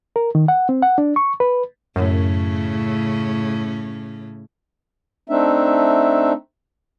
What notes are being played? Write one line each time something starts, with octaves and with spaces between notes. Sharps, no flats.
A#4
D#3
F#5
C4
F#5
D4
C#6
B4
F#2 A2 C#3 C#4
A3 C4 D4 D#4 E5